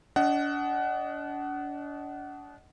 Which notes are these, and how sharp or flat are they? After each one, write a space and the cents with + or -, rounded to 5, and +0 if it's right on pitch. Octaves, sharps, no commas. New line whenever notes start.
D4 -35 D#5 +0 F#5 +20